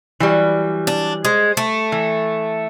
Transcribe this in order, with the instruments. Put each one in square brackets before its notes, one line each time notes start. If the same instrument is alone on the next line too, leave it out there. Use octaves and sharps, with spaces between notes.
[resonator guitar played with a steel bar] E3 F#3 G3
[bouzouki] D4
[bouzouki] G#3 [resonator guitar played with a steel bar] C5
[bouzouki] A3
[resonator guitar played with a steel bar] E3